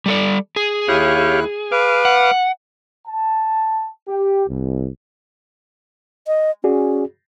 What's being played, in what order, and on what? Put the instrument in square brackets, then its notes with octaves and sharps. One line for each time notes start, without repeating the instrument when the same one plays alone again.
[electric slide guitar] G3 A4 D5
G#4
[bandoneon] D#2 E4 F#6 [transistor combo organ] G4 C#5 F5
[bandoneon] B4 [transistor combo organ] F5 D6
[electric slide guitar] F#5
[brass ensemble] A5
G4
C2
[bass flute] D#5
[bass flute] C#4 [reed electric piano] F#4 G#4 D5